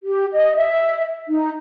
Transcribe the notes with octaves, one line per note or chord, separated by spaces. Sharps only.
G4
D#5
E5
D#4